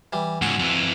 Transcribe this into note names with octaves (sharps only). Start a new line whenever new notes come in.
E3 G3
C#2 G#2 F#4 G#5
F2 E3